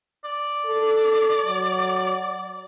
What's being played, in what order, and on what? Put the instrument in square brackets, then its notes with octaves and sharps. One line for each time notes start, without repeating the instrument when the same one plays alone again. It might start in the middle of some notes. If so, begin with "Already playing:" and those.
[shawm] D5
[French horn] A4
F#3